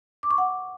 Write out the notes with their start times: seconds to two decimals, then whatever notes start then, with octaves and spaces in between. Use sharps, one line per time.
0.23 D6
0.31 C#6
0.38 F#5